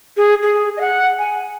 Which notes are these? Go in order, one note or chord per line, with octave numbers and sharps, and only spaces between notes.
G#4
G#4
D#5
F#5
G#5